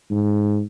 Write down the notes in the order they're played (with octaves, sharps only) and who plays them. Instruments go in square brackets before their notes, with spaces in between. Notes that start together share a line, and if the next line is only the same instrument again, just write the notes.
[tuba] G#2